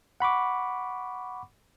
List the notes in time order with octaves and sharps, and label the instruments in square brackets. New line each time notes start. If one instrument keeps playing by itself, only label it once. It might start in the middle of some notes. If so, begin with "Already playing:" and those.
[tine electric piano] F#5 B5 C#6 D6